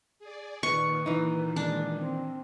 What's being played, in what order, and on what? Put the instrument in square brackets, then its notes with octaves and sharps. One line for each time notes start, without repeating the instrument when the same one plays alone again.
[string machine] G#4 D5
[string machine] A#2 D#3 [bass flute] B4 [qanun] C#6
[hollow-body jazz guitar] E3 D#4
[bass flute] G#3 [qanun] D4
[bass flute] C4